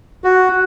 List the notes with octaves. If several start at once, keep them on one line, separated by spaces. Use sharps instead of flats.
F#4